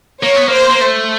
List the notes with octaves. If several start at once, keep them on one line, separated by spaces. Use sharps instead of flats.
A#3 C#5
B3
A#3 C5
A#3
A3